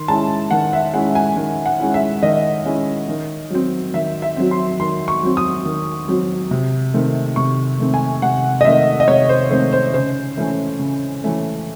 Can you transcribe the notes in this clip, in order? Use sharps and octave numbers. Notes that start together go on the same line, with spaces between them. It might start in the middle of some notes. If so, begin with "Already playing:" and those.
Already playing: D#3 C6
G#3 C#4 E4 A5
D#3 F#5
E5
G#3 C#4 E4 F#5
G#5
D#3
F#5
G#3 C#4 E4
E5
D#3 D#5
G#3 C#4 E4
D#3
F#3 C4
D#3 E5
E5
F#3 C4
C6
D#3 C6
C#6
F#3 C4
D#6
D#3
F#3 C4
C3
D#3 A3 C4
C3 C#6
D#3 A3 C4
G#5
C3 F#5
D#5
D#3 A3 C4 E5
D#5
C3 C#5
C5
D#3 A3 C4 C5
C5
C#3 C5
E3 A3 C#4
C#3
E3 A3 C#4